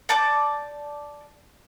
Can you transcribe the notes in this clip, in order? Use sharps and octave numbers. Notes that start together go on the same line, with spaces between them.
D5 A5 D6 G6